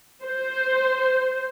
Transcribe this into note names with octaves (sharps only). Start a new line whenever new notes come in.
C5